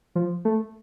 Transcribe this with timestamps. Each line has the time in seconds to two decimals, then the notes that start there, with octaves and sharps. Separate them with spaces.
0.15 F3
0.45 A3